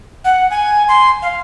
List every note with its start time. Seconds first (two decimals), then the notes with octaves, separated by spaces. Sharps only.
0.24 F#5
0.51 G#5
0.88 C6
1.22 F5